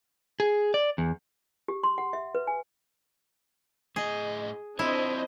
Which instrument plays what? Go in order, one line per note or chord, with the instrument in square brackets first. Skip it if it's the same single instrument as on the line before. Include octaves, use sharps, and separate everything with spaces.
[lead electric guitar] G#4
D5
E2
[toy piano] G4
C6
F#5
E5
B4
G#5
[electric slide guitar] A2 D#5 [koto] G#4
[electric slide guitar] C4 F4 C#5 [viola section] D4 C5 D#5 [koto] E4